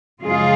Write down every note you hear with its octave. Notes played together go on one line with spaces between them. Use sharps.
F#2 C#3 F3 G#3 F4 G#4